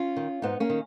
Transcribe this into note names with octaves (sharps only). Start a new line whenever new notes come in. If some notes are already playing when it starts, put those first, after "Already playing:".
Already playing: C#4 F4
D#3
G#2 B3 D#4
A#3 C#4
D#3